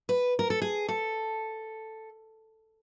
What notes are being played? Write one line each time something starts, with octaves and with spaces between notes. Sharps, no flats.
B4
A#4
A4
G#4
A4